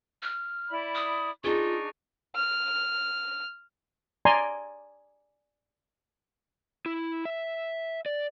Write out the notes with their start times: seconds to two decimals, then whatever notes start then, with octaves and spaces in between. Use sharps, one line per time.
0.23 F6
0.70 E4 D5 B5
0.95 D#6
1.44 D4 D#4 F4 G#4 C#6
2.36 F6
4.25 D5 G#5 A#5 C6
6.86 E4
7.25 E5
8.06 D5